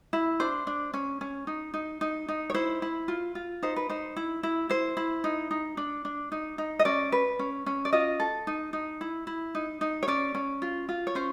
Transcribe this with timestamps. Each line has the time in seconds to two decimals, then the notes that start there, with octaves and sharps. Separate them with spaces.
0.13 E4
0.40 D4 C5
0.67 D4
0.94 C#4
1.21 C#4
1.47 D#4
1.74 D#4
2.01 D#4
2.28 D#4
2.50 C#5
2.54 E4 C5
2.82 E4
3.08 F4
3.35 F4
3.62 D#4 C5
3.76 B4
3.89 D#4 C5
4.16 E4
4.43 E4
4.69 E4 C5
4.97 E4
5.24 D#4
5.51 D#4
5.77 D4
6.05 D4
6.32 D#4
6.58 D#4
6.79 D#5
6.85 C#4 D5
7.12 B4
7.39 C#4
7.66 C#4
7.85 D5
7.93 F4 D#5
8.20 A4
8.47 D#4
8.73 D#4
9.01 E4
9.27 E4
9.55 D#4
9.81 D#4
10.03 C#5
10.08 C#4 D5
10.35 C#4
10.62 F4
10.89 F4
11.07 C#5
11.15 C#4 C5